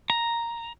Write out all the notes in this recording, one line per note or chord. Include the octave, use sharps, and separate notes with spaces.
A#5